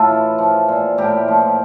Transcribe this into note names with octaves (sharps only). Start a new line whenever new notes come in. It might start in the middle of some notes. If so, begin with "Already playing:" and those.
Already playing: A2 F4 A4
E3
F3
A#2
A2 G4 A#4
F3